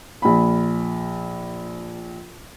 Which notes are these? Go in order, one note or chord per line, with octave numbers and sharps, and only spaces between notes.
A#1 B5